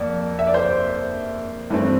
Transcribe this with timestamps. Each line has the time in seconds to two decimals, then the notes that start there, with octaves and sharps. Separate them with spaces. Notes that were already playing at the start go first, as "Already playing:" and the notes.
Already playing: F2 A#3 D5
0.39 E5
0.47 D5
0.54 C5
1.70 G2 E3 A3 C4